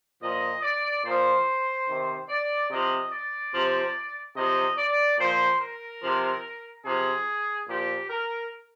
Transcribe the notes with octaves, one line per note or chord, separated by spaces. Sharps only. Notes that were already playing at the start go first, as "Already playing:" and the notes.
A#2 F3 D#5
D5
A#2 F3 C5
C3 D#3
D5
C3 F3 D#5
D5
C3 F3
C3 F3 D#5
D5
A#2 F3 C5
A#4
C3 F3
C3 F3 G#4
A#2 F3 G4
A#4